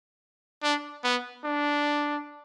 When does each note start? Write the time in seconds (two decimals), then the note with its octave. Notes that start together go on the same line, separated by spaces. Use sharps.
0.63 D4
1.04 B3
1.44 D4